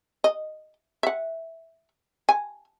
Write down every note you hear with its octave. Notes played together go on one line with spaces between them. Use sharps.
D#5
E5 F#5
G#5